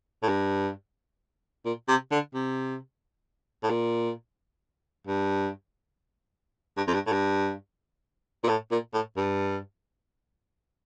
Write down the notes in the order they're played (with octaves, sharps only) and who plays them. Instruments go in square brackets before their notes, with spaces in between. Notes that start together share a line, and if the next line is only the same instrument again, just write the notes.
[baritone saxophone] A2
G2
A#2
C3
D3
C3
A2
A#2
G2
G2
F2
G2
A2
G2
A#2
A2
A#2
A2
G2